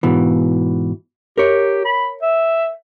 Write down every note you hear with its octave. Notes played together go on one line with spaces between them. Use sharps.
G#2 B2 E3
G4 A#4 C#5
B5
E5